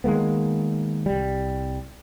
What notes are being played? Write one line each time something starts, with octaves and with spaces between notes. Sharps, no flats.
D#3 G#3 A#3 B3
C2 G3